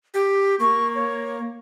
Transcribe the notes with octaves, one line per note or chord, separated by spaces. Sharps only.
G4
A#3 C#6
C#5